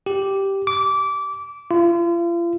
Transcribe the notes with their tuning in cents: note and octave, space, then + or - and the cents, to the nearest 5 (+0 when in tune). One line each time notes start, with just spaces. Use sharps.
G4 -5
D6 -20
F4 -40